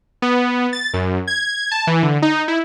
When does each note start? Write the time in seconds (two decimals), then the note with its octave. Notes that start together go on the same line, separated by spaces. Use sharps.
0.22 B3
0.73 A6
0.94 F#2
1.27 G#6
1.71 A5
1.87 E3
2.03 D3
2.22 D#4
2.48 E4